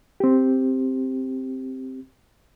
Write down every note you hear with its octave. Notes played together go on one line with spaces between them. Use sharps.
C4 G4